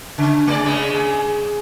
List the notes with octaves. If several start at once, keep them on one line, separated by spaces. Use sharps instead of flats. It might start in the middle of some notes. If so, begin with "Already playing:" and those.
C#3
A3 G#4 D5
C#3 G#3
G#4